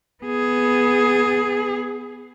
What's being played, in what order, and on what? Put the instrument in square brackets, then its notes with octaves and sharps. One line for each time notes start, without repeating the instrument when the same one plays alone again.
[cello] B3 G#4